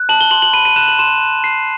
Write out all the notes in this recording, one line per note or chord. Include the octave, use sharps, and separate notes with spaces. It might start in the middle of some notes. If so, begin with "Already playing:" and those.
Already playing: F#6
A5 F#7
G7
C6 F#7
F#7
B5 D#7
D#7
F#6 E7
F#7
C6 E7
F#6
C6 C7